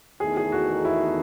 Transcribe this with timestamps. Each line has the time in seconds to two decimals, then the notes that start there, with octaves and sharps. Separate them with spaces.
0.20 E2 D#3 A3 D#4 G#4
0.37 G#4
0.52 F#4
0.85 E4